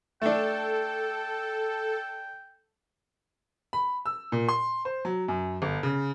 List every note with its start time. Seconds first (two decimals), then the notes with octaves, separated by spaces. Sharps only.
0.22 A3 D4 A4 G5
3.73 B5
4.06 E6
4.32 A#2
4.49 C6
4.85 C5
5.05 F#3
5.28 F#2
5.62 G1
5.83 C#3